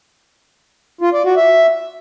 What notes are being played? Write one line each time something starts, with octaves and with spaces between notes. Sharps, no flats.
F4
D5
F#4
E5